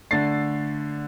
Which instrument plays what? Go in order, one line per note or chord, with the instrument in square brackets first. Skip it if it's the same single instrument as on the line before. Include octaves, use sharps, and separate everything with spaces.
[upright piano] D3 A3 D4 A6 C7